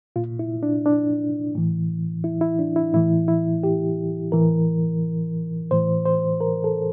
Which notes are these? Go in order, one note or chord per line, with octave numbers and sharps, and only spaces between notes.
A#2 F4
E4
D4
D4
A2 E3
E4
E4
D4
E4
A2 E3 E4
E4
G4
A2 E3 A#4
A2 E3 C5
C5
A#4
A4